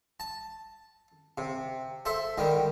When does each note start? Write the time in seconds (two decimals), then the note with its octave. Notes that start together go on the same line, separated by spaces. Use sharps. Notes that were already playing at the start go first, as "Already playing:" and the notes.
0.20 A5
1.38 C3
2.05 A4 C5 E5
2.38 D3 D#3 G3